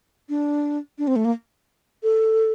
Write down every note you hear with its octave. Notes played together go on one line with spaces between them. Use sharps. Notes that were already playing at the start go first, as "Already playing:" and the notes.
D4
D4
C4
A3
A#3
A4